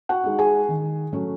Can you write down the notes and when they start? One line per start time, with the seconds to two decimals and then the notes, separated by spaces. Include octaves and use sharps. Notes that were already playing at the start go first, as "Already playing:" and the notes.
0.09 F#4 F#5
0.24 G#3 D#4
0.39 G#4 G#5
0.69 D#3
1.13 F#3 A3 C#4